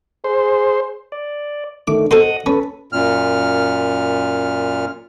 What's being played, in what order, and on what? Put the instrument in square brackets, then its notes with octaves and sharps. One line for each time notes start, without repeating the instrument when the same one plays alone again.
[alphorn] G#4 [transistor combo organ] C5
[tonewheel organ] D5
[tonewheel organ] D3 D#3 A3 [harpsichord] D6
[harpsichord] A4 C5 C6 [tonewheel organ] D#5 F#5 D#6
[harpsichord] C#4 [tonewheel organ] A4 B4
[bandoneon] F#2 A#2 F6